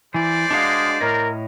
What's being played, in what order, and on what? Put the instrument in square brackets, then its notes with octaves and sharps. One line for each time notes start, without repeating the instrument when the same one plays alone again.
[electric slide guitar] E3 [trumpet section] G3 C5 D5
[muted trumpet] G#3 [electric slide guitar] D4 F#4 F5
[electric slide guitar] A2 C#5 D#5 [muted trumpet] A#4